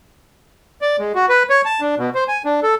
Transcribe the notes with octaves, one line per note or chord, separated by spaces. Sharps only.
D5
G#3
F#4
B4
C#5
A5
D4
B2
C5
G#5
D4
A4